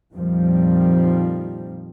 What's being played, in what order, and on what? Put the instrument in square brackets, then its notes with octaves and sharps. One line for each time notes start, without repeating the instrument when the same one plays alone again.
[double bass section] F2 A#2 D#3 F3 G3 C4